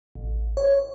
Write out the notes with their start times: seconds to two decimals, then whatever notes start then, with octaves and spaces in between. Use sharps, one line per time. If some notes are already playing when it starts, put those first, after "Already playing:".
0.15 A1
0.57 C#5